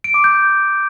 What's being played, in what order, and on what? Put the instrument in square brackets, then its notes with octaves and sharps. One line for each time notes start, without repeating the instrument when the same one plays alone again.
[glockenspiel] D7
D6
G6